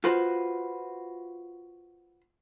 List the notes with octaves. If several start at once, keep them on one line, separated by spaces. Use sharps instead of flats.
F4 F#4 B4 C5